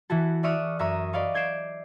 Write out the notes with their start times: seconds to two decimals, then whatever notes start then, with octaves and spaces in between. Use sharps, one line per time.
0.10 E3 E4 F#4 A4
0.43 D5 E5 C#6 D#6 F6 F#6
0.79 F#2 E5 A#5 C#6 D#6
1.13 B4 D5 D#5 F5 C#6
1.34 G6 G#6 C7 D7 E7